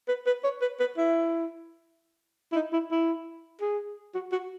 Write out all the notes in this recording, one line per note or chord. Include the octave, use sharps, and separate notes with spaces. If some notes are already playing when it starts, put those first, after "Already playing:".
B4
B4
C#5
B4
B4
E4
E4
D#4
E4
E4
G#4
F#4
F#4